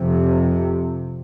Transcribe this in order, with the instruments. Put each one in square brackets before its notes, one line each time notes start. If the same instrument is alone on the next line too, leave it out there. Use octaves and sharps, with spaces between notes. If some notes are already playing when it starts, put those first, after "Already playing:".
Already playing: [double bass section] F2 C3